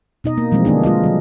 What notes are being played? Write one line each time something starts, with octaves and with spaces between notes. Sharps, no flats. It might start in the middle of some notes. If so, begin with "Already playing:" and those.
B2 D#4 D#5
A#3
B2 E3 F3 G3 G#3 C4
D3 A#3 D4 G#4
G#3 F4 G#4 D#5
D#3 F#3